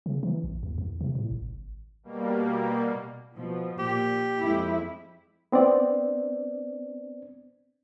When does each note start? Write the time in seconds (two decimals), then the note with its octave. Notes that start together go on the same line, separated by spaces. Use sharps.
0.06 C#3
0.23 E3
0.44 A1
0.63 D#2
0.78 E2
1.01 C3
1.15 A2
1.31 G#1
2.03 B2 G3 A#3
3.34 B2 F3
3.79 A#2 G4
4.39 F2 G#3 E4
5.52 B3 C4 D4 D5